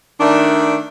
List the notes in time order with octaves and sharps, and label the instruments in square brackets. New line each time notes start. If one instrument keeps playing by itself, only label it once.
[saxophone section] D#3 A3 D4